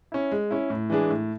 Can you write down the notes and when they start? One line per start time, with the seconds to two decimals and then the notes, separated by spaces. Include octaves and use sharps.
0.12 C#4 E4
0.32 G#3
0.51 C#4 E4
0.70 A2
0.90 E3 G#3 D4 G#4
1.10 A2